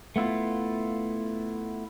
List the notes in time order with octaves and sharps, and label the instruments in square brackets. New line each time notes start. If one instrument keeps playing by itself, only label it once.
[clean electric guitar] A3 B3 E4 F4